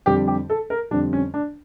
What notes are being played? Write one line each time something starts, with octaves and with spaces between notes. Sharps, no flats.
F2 D3 G3 G4
G4
A4
A#4
F2 D3 G3 D4
C#4
D4